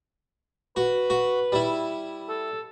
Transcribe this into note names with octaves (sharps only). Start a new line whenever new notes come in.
F#4 B4
F#4
G3 E4
A4